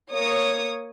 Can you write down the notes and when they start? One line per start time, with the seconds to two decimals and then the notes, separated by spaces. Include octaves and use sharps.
0.13 A#3 C#5 D#6